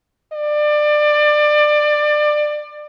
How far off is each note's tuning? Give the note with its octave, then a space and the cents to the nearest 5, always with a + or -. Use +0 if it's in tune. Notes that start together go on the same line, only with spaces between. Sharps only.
D5 +25